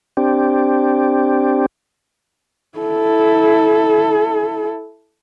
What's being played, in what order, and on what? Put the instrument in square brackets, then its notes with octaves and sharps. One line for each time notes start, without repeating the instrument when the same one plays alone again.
[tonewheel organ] C4 D4 G4
[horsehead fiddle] E4 A4